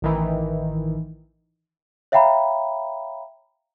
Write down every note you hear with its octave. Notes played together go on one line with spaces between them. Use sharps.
A1 D#3 E3
C#5 E5 F5 G5 A#5 B5